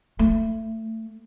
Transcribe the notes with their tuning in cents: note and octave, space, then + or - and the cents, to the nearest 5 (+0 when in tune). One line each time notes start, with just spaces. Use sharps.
A3 +20